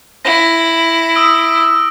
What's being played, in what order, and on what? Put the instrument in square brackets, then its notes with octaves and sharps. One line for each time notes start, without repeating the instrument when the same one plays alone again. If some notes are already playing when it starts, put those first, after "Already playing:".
[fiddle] E4 [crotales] A#6
[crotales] D#6 E6 D7